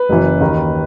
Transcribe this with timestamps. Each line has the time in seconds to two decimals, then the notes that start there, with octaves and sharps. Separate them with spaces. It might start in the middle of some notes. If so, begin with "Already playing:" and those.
Already playing: B4
0.09 F#1 F#2 E3
0.41 D#2 D#3